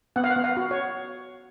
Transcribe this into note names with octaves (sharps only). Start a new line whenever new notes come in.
B3 F#5
F5
F#5
B3
F5
F#4
C#5